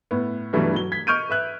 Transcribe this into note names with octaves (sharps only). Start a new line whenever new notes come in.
A2 B3
G2 B2 E3 F#3 G3 A3
F#3 G7
G#6 B6
D#5 C#6 F6 G6 D7 D#7
B4 E5 F#6